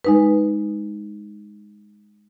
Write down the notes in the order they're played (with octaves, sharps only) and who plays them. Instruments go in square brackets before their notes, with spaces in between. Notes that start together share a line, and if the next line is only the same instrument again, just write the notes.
[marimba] G#3 D#4 B4